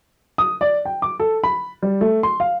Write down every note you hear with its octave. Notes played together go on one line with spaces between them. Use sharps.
D#6
D5
G5
D6
A4
B5
G3
A3
C6
F5